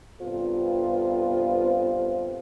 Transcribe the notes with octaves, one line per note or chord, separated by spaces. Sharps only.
G2 C3 B3 F4 A4 C5